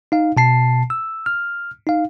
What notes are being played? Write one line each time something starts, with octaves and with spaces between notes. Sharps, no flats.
D#4 F5
B2 A5 C7
E6
F6
D#4 F5